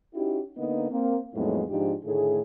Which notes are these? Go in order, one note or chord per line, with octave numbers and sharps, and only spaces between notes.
C#4 D#4 E4 F#4 G4
D3 A#3 B3 D#4
A#3 C4
F2 A2 F#3 G#3 B3 D#4
G#2 F3 D4 D#4 F4 G4
A2 D3 D#3 A3 G#4